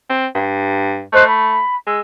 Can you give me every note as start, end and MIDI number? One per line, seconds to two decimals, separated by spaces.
0.10 0.27 60
0.35 1.03 43
1.13 1.60 57
1.13 1.23 72
1.13 1.23 75
1.13 1.23 90
1.26 1.74 83
1.87 2.00 56
1.87 2.00 88